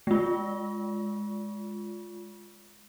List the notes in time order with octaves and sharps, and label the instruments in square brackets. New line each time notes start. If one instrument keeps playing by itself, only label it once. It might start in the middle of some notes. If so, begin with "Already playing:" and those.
[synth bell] G#3 F4